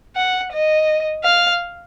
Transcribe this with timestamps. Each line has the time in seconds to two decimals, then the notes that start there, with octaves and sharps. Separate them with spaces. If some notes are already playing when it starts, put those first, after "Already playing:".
0.16 F#5
0.53 D#5
1.24 F5